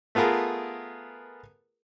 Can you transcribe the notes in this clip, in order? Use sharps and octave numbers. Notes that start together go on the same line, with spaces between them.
A3 B3 F4 G#4 A#4